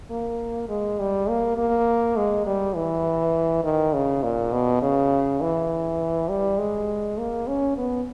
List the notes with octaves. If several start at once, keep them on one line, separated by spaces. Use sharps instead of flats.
A#3
G#3
G3
A#3
A#3
G#3
G3
E3
D#3
C#3
A#2
B2
C#3
E3
G3
G#3
A#3
C#4
B3